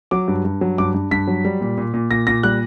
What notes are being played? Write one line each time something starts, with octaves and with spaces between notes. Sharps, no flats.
F#3 D6
G2
G2
F#3
G2 D6
G2
G2 B6
F#3
G3
A#2
A#2
A#2
A#2 A#6
A#2 A#6
G3 F#6